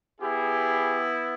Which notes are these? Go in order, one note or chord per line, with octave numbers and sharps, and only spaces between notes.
B3 E4 G4 G#4